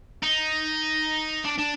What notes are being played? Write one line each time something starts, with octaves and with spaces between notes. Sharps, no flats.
D#4
D4
D4